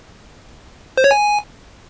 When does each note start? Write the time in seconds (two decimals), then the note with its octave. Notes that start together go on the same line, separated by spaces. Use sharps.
0.97 C5
1.04 C#5
1.11 G#5